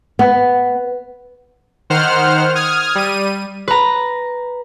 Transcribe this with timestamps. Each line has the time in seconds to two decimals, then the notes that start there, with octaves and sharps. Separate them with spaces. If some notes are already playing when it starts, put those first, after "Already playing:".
0.19 B3
1.90 D#3 C5 F#5 F6
2.55 D#6 F6 G#6
2.95 G3 D#7
3.68 B4 A#5